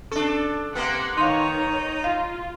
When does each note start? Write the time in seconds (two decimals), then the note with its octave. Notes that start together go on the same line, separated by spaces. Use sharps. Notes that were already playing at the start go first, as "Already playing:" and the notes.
0.12 C#4 D4 A4
0.75 C3 A#3 B3 F#5 C6
1.17 D#3 D#4 C#5 F5 C6
2.04 F4 F5